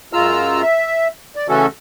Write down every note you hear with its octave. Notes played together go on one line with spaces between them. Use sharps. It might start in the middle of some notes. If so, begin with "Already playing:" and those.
F#2 G#3 F4 A#5 E6 F6
E5
D5
C#3 E3 A3 C#4 F#4 A4